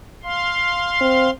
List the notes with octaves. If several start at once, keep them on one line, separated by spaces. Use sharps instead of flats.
F5 C6
C4